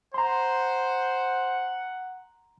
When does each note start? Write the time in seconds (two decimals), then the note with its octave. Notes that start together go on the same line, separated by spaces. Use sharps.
0.14 C5 F#5 A#5 C6